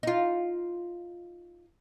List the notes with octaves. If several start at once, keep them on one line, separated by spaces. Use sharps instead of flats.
D#4 F4